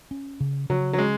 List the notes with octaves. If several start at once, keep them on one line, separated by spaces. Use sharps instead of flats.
C#4
C#3
C#3 F#3
F#3
G#3 C#4